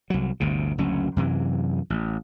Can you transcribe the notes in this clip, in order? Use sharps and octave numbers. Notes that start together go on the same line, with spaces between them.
C2 F#3
G1 D2 C3
F#1 D2 F#3 C#4
F#2 C3 E3
A1